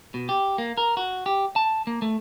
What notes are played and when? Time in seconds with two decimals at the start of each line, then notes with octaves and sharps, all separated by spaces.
0.14 B2
0.29 G4
0.58 A#3
0.77 A#4
0.97 F#4
1.26 G4
1.56 A5
1.87 A#3
2.02 A3